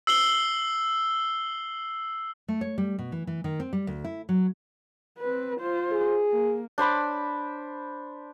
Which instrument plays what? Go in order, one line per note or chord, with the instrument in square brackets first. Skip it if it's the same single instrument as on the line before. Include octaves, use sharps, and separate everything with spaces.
[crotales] E6 C7 F#7 G7
[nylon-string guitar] A3
C#5
G3
B2
E3
E3
D#3
C4
G3
D2
E4
F#3
[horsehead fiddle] C4 B4
F4 C5
[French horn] G#4
[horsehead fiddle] A#3
[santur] D4 C5 B5 D6